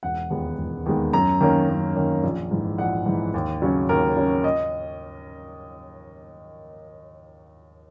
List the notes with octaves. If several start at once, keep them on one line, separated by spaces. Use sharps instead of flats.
E1 F#5
D#2 D#3 G#3 B3
E1
D#2 D#3 G#3 B3
F#2 A#5
D#3 A#3 C#4
F#2
D#3 A#3 C#4
A#1
G#2 E3
A#1 F#5
G#2 E3
D#2
C#3 F#3 C#4
D#2 A#4
C#3 F#3 C#4
D#5